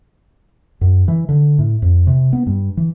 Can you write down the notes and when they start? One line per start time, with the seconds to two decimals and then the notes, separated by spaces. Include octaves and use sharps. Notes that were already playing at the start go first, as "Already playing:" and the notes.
0.81 F#2
1.08 E3
1.29 D3
1.59 A2
1.82 F2
2.07 C3
2.33 B3
2.47 G2
2.77 E3